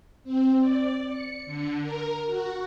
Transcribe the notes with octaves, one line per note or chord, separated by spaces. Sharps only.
C4
D5
C#7
D3
A#4
F#4